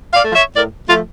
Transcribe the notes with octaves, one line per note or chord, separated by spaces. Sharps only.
D5 F5
F3 A3
C#5 E5
A2 A#4 D5
F3 A3 F4